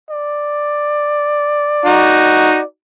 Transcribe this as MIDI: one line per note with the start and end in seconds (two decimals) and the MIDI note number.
0.10 2.65 74
1.86 2.58 63
1.86 2.58 66